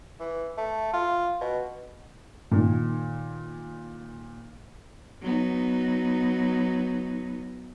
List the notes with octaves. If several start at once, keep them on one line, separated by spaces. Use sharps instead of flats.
E3
A3
F4
B2
A#2 D#3
F#3 B3 D#4